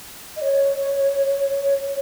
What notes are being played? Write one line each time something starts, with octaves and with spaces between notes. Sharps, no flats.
D#5
C#5